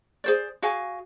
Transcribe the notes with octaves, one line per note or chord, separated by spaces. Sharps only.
G#4 C5 D5
F#4 G#4 F5 G#5